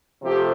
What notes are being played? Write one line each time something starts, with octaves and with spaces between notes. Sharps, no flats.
C3 F3 A3 C4 G4